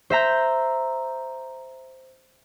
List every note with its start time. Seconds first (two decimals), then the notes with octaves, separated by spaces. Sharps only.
0.10 C5 E5 A#5 G6